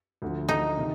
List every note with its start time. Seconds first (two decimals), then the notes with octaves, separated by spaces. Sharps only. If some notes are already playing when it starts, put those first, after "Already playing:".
0.22 D2 D3 F3
0.49 D#4
0.77 C3 D#3